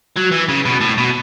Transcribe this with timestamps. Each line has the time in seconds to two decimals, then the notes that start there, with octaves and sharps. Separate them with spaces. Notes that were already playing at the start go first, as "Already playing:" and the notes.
0.17 F#3
0.32 E3
0.49 C#3
0.65 B2
0.81 A2
0.98 B2